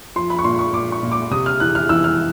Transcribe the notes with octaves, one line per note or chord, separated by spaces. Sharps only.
F3 C6
B5
C#6
A#2 C6
C#6
A#2 D6
C#6
A#2
D6
C3 D#6
F6
E3 F#6
F6
E3 E6
F6